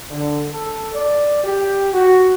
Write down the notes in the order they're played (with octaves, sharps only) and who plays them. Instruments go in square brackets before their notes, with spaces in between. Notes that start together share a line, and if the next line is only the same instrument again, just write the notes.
[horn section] D3
A4
D5
G4
F#4